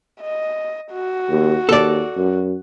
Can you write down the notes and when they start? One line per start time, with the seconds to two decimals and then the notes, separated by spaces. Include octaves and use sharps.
0.22 D#5
0.92 F#4
1.30 D#2
1.69 D#2 A4 D5
2.17 F#2